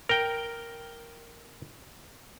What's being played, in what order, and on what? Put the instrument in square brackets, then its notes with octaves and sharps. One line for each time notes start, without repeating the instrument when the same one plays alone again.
[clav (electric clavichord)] A#4 G5